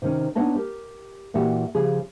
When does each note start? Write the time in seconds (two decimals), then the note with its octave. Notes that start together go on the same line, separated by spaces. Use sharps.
0.02 C3 D#3 C#4
0.35 B3 D4 D#4 C#5 D#5 A5
0.56 G4 A#4
1.34 A#2 E3 F#4 G4
1.75 C#3 F3 G4 G#4